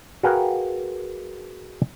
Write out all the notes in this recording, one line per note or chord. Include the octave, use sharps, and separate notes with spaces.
F#4 G#4 A#4 B4 F5 G5